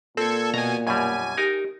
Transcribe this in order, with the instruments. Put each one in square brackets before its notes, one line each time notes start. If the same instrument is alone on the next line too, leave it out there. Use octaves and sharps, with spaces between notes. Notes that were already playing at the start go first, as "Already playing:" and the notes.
[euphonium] A#2 [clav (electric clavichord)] C4 [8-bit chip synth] A4 G#6
[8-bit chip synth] B2 G#5 [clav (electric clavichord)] A#5
[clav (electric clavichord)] F#2 B2 G3 [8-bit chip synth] G#5
[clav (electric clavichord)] D#4 A#4 [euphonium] G4